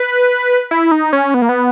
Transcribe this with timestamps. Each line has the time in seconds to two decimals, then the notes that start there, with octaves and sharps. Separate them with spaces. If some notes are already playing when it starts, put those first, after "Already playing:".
Already playing: B4
0.71 E4
0.91 D#4
1.13 C#4
1.34 B3
1.42 A#3
1.49 B3